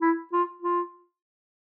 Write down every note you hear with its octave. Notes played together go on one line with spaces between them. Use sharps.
E4
F4
F4